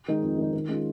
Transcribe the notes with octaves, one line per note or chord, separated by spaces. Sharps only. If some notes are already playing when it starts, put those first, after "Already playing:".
D#3 G#3 D#4
F2
D#3 G#3 D#4
D#3
G#3 C#4 F4